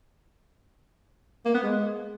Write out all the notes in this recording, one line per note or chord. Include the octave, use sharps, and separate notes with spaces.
A#3
B3
G#3